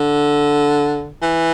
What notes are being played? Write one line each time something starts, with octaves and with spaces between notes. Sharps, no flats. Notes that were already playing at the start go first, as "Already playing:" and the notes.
Already playing: D3
E3